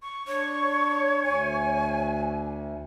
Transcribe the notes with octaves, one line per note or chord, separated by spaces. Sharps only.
C#6
D4 C#5
D2 G#5